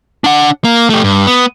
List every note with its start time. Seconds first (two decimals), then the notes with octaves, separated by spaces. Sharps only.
0.24 D4 F#5
0.64 A#3
0.90 A3 G4
1.04 G2
1.27 B3